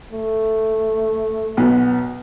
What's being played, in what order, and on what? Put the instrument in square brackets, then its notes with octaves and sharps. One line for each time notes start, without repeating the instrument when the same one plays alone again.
[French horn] A3
[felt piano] B1 B3